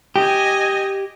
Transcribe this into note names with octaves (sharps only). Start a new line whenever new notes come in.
G4 D#5 G#5